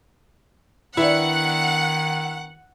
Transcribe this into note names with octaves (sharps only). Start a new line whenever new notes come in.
D#3 B3 D4 E4 F#5